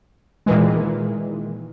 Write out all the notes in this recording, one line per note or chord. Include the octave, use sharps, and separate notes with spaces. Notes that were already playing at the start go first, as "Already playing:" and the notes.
A#2 D#3 E3 G#3